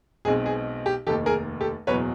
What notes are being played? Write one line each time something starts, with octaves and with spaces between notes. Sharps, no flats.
B1 B2 G#3 C4 G#4
G#4
G4
F1 D#2 D#3 G4 A4
G#4 A#4
G4 A4
F#1 E2 B2 F#3 B4 C#5